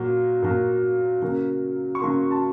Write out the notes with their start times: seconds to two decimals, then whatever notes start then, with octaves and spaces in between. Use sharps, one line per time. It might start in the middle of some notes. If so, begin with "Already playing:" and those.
Already playing: A#2 F#3 A#3
0.42 A#2 F#3 A#3
1.22 C#3 F#3 A#3
1.95 C#6
2.01 C#3 F#3 A#3 C6
2.31 A5